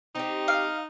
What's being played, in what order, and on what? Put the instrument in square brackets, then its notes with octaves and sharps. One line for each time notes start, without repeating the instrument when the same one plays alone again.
[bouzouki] C4 G4 [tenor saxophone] D#4
[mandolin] F5